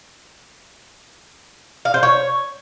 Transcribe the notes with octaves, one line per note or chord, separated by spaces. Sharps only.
F5
C5
C#5